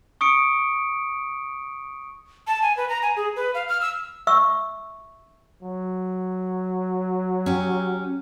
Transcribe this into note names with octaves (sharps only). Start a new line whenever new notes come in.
C#6 D#6 C#7 D7
A5
G#5
B4
A#5
G#5
G#4
B4
F5
F6
E6
E5 C#6 E6
F#3
C#4 G4